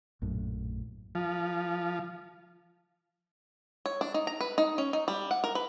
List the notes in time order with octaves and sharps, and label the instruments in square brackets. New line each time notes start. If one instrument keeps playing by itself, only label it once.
[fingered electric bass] A#1 F#2 A2
[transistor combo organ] F3
[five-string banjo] C#5
D4
D#4
A#5
B4
D#4
C#4
D#4
G3
F#5
A#4
B4